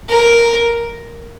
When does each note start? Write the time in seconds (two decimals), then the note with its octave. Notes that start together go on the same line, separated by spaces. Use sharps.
0.10 A#4